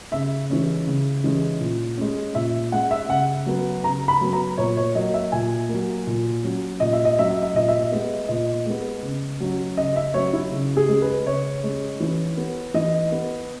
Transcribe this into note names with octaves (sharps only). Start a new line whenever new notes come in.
C#3 E5
E3 G#3 C#4
C#3
E3 G#3 C#4
A#2
G#3 C#4
A#2 E5
G#3 C#4 F#5
E5
C#3 F#5
F#3 B3
C#3 A#5
B5
F#3 B3
A#5
A#2 C#5
C#5
F#3 A#3 D#5
E5
A#2 G#5
F#3 A#3
A#2
F#3 C#4
A#2 D#5
E5
D#5
F#3 C#4 E5
D#5
E5
A#2 D#5
E5
D#5
G#3 B3
A#2 D#5
G#3 B3
C#3
F#3 C#4
C#3 D#5
E5
F#3 C#4 C#5
E4
C#3
G#4
G#3 C#4
B4
C#3 C#5
G#3 C#4
E3
B3
E3 D#5
B3